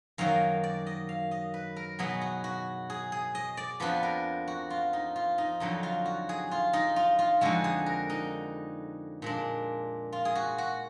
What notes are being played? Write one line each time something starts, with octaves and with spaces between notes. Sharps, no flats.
F#2 D#3 F#3 A#3 F5
D5
D#5
F5
D#5
B4
A#4
B2 F#3 B3 D#4 G#4
F#4
F#4
G#4
G#4
D#5
D5
F2 F3 B3 D4 B4
A#4
F#4
F4
D#4
F4
D#4
F2 D3 F#3 D#4
F4
F#4
G#4
F4
D#4
F4
F4
F2 D3 G#3 F#4
G#4
A#4
D#4
A#2 G#3 D4
F4
G#4
F#4
F#4